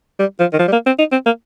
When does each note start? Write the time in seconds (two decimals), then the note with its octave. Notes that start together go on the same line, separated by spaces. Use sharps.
0.19 G3
0.40 F3
0.53 D#3
0.59 F3
0.68 G3
0.72 A#3
0.86 C4
0.99 D#4
1.12 C4
1.26 A#3